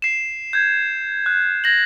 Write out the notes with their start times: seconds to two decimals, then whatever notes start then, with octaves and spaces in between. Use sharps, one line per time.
0.02 C7 E7
0.53 G6 G#6
1.26 F#6
1.64 G#6 A#6 F#7